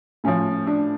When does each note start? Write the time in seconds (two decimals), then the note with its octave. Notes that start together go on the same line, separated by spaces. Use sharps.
0.24 A2 F3 C#4
0.67 D4